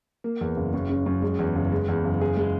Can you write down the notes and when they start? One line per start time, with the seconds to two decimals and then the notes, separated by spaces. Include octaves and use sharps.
0.24 A#3
0.41 E2
0.57 F#1
0.74 F#2
0.89 C#3
1.06 F#2
1.22 G#3
1.39 E2
1.56 F#1
1.72 G#3
1.88 E2
2.04 F#1
2.21 G#4
2.37 G#3